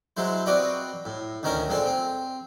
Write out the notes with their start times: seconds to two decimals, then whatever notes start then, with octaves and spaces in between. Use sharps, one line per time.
0.17 F#3 G#3 E4 C5
0.46 C4 F#4 B4 D5 D#5
1.05 A2
1.43 D2 D#3 C#4 A#4 D#5
1.68 A#2 G#3 C4 A4
1.85 C4